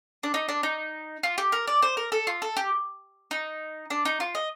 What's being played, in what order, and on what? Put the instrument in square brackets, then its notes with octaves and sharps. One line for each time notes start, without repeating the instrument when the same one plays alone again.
[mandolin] D4
D#4
D4
D#4
F4
G4
A#4
D5
C5
A#4
A4
F4
A4
G4
D#4
D4
D#4
F4
D#5